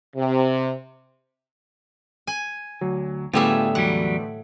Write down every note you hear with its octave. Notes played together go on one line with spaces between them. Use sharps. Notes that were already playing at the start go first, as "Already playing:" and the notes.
C3
G#5
D2 F#3
A2 D3 G3 A3 B3 F4 G#4 E5
E2 F#3 G3 F#5